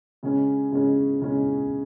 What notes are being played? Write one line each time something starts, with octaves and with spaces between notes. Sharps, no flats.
C#3 G#3 C#4
C#3 G#3 C#4
C#3 G#3 C#4